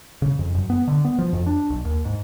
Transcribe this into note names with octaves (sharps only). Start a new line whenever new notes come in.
C#3
F2
F#2
B3
D3
B3
F3
F2
D4
B1
D#2
G#2